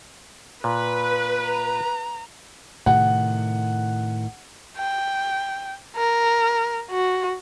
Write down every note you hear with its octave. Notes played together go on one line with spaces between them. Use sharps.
A#2 B4
A#5
A2 C3 D#3 F#5
G5
A#4
F#4